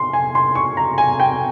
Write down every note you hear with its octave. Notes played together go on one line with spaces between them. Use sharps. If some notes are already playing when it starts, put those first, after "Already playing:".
Already playing: C6
G#5
C6
C#6
A#5
G#5
G5